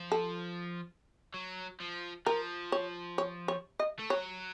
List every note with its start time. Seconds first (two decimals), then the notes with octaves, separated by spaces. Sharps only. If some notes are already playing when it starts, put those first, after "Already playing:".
Already playing: F3
0.12 A4
1.34 F#3
1.80 F3
2.26 F3 A#4
2.72 C#5
3.18 C#5
3.48 C#5
3.79 D#5
3.99 A3
4.10 F#3 C#5